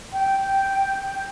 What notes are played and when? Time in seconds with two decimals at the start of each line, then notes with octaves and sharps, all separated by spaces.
0.12 G5